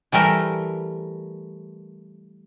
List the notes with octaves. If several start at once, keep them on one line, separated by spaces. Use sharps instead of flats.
E3 G3 A3 A#4